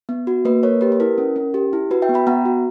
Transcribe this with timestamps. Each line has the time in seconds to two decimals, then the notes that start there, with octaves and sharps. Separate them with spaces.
0.09 B3
0.27 F#4
0.45 A#3 B4
0.63 A#3 A#4 C#5
0.81 G4 B4
0.92 B4
1.00 E4 A#4
1.18 C#4
1.36 C#4
1.54 G4
1.73 E4
1.91 F#4 B4
2.02 E5 G5
2.09 B3
2.14 G5 B5
2.27 B3 F#5 A#5
2.45 F#4